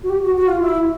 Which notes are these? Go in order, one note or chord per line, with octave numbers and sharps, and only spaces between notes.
F#4
G4
F#4
F#4
F4
E4